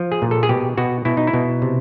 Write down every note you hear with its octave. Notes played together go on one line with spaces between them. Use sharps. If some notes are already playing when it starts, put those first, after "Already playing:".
Already playing: F3
G#4
A#2
A4
G#4
B2 G4
B2 F#4
B2 E4
D#4
E4
B2
C3